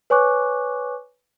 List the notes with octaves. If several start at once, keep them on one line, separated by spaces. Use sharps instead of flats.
B4 C#5 G#5 C#6 D6 F#6